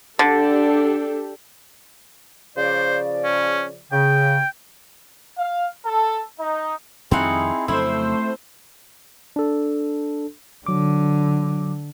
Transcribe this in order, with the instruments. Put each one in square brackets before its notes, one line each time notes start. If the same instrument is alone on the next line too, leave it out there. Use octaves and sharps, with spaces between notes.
[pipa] D3 [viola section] D4 G4 A4
[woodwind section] C#3 F3 D5 [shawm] C5
[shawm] C#4
[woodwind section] C#3 [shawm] G5
[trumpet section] F5
A4
D#4
[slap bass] F2 D#3 G3 [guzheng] C4 D#4 F#5 [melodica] E4 G#4
[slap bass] F2 C#3 F#3 [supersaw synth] A3 C5 [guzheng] E4 [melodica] E6
[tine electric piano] D4 A4
[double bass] D3 [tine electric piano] F#3 D6